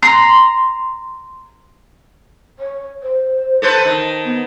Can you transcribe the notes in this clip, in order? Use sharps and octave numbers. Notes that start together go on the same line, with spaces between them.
A#5 C6
C#5
C5
A4 B4 C5
D#3 A5
B3